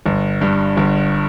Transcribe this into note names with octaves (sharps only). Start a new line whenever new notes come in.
G1
G2
G1